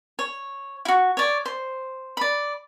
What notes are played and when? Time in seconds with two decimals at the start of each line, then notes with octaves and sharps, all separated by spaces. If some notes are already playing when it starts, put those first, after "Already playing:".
0.19 C#5
0.85 E4 F#4
1.17 C#5 D5
1.46 C5
2.17 D5 B5